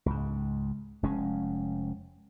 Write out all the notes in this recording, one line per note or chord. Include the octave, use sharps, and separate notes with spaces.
C#2 G#2
F1 G#3 C#4